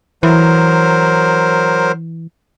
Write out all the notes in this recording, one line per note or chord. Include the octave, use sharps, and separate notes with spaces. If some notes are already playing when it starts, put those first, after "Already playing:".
E3 F#3 A#4 C5